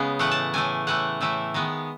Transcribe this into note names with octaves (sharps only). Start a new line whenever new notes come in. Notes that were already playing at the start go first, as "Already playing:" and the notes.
Already playing: C#3 G#3 B3
A2 E3 A3 F#5
A5
A2 E3 A3 G#5
A2 E3 A3 F#5
A2 E3 A3 E5
D#3 G#3 B3